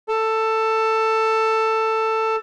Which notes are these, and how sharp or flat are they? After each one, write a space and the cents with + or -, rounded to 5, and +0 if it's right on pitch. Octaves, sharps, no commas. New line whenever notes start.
A4 +10